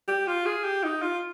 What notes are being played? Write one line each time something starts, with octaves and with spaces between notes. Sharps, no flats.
G4
F4
G#4
G4
D#4
F4